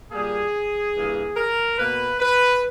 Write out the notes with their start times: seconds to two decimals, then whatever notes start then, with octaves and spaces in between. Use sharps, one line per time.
0.12 A#2 G3 A#3 G#4
0.95 G2 E3 A#3
1.36 A#4
1.77 B2 A#3 B4
2.19 B4